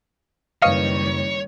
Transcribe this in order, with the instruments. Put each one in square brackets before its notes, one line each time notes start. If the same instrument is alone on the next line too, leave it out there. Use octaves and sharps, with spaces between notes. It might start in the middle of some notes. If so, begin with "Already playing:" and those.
[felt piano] F#1 B4 D#7 [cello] D#3 G3 [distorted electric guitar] C#5 [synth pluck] D#5 F5